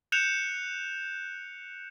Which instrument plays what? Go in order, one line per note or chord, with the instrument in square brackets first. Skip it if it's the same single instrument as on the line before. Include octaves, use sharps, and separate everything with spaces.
[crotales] F#6 G6 C#7 E7 F7